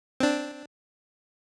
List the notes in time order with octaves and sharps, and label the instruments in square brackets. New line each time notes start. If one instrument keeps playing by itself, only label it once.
[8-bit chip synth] C4 D4